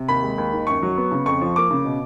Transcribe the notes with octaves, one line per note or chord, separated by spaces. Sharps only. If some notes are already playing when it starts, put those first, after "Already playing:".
Already playing: C3
D#2 B5
G#3
D#2
D#3
F#2 C#6
F#3
B3
C#3
F2 C#6
F3
A#3 D6
C#3
B2